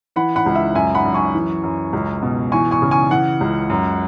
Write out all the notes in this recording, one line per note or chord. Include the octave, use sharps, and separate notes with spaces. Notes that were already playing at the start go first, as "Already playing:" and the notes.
E3 F#5 B5
F#5 B5
C#2
E5
F#2 E5 G#5
F#5 B5
F#2
G#5 C#6
E3
F#2
C#2
B2
E3 G#5 C#6
G#5 C#6
C#3
G#5 C#6
E3 F#5
C#2
F#2